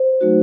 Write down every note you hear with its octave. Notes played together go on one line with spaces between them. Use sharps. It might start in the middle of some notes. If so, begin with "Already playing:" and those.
Already playing: C5
F#3 A3 D#4 F#4